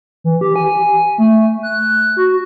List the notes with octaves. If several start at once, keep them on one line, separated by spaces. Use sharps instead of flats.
E3
G4
G#5
A3
F#6
F#4